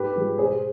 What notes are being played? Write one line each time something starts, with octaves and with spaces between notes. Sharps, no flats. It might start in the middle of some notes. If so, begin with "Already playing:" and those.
Already playing: G#2 G4 B4
F3 G#3
B2 G#4 C5